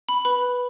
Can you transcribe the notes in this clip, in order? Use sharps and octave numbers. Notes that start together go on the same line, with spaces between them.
B5
B4 B5